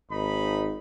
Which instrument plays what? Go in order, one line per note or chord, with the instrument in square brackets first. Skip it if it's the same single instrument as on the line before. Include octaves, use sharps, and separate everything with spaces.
[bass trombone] G#1 [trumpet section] D#4 B5